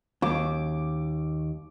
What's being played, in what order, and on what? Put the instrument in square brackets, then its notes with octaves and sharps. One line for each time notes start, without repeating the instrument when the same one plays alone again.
[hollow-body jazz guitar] D#2 [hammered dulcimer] D6